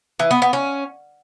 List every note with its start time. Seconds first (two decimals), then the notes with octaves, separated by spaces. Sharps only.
0.19 E3
0.31 B3
0.42 B3
0.53 C#4